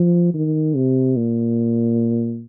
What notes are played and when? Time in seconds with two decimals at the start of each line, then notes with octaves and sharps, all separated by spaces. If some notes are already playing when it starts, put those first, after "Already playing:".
Already playing: F3
0.34 D#3
0.76 C3
1.17 A#2